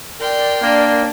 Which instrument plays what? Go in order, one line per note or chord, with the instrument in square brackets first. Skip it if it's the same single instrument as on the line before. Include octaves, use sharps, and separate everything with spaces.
[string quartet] A#4 G5 C6 [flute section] D5
[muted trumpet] A#3 [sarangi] D4